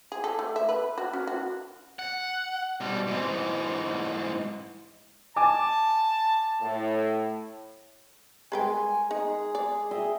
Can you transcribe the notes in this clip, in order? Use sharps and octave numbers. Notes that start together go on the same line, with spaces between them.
G#4
A4
A3
E5
B4
F#4
C#4
F#4
F#5
B2 G3
G#2 E3
G#5 A5 D6
A2
G#3 G#4 A#4 B4 G5 G#5
D#4 G#4
D5
D#5 E5 G5